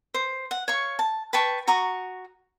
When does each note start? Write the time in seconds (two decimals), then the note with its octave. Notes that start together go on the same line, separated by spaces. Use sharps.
0.14 C5
0.51 F#5
0.68 C#5 F5 C#6
0.99 A5
1.33 B4 G5 A5 C#6
1.67 F#4 A#5 C#6 D#6